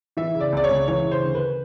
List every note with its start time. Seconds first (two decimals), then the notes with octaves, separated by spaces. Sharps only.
0.17 E3 E5
0.34 C#3
0.40 D5
0.52 C#2 D5
0.64 C#5
0.70 C#2
0.88 E3 C#5
1.05 C#3
1.11 C5
1.22 D2
1.35 B4